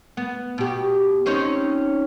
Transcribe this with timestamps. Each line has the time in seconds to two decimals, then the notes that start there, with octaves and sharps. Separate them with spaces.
0.17 B3
0.58 B2 G4
1.26 C4 C#4 D#4